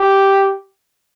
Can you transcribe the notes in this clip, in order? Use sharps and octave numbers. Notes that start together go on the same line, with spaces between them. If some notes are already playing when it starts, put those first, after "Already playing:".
Already playing: G4